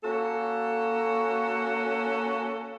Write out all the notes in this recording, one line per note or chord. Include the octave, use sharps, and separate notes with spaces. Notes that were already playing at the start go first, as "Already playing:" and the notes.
A#3 C#4 F#4 A4